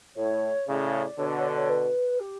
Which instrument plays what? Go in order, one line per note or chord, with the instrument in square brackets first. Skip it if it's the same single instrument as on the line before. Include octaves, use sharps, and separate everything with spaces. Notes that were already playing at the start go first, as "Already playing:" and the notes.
[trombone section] A2 [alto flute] C#5
[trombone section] A2 C#3 [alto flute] D5
[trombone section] B2 D3 [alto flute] C#5
[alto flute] D5
C#5
D5
C#5
B4
G4